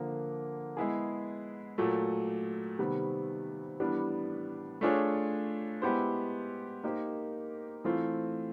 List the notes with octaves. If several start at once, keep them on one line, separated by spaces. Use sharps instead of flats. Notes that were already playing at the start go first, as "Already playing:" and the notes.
Already playing: D3 F3 A#3
G#3 B3 E4 G#4
A#2 F#3 A3
C3 D#3 G3 B3
A2 E3 G3 B3 D4
A3 D4 F4 G#4 C#5
G#3 B3 E4 G4 C5
A#3 D#4 G4 C5
E3 A3 C4 F4